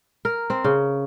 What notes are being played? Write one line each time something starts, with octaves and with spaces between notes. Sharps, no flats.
A#4
C4
C#3